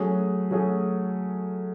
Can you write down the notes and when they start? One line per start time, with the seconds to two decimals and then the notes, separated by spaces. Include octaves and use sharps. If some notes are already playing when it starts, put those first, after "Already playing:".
Already playing: F#3 A3 C#4 G#4
0.51 F#3 A3 C#4 G#4